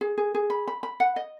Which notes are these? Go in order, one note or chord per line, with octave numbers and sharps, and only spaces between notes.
G#4
G#4
G#4
B5
B5
B5
F#5
D#5